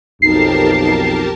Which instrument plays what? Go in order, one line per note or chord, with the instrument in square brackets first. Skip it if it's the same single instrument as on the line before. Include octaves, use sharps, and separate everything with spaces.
[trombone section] B1 F2 [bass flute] D#4 [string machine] G4 A#4 A5 [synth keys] C7